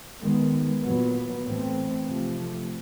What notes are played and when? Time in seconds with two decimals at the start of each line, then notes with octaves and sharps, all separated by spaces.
0.21 D#3 G#3 B3
0.83 A#2 F#3 B3
1.45 A2 E3 A3 C4
2.07 C3 F3 A3